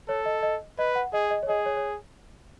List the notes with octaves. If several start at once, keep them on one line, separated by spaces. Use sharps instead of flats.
A4 C#5
D#5
D#5
B4 D#5
F#5
G#4 D#5
D#5
C#5
G#4 D#5
C#5
C#5